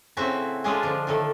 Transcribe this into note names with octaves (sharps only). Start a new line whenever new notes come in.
A2 C#3 C4 E4 F#4 E5
G#3 C#4 D4 F4 G#4 A4
D3 F3
A2 D3 D#3 A4